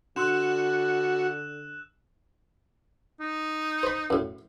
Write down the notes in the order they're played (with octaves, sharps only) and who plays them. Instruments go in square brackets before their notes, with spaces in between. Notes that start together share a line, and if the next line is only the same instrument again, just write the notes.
[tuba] D3 [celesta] D4 C6 [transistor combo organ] F#4 [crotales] E6 F#6 E7
[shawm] D#4
[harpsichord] C5 B5
F#2 A2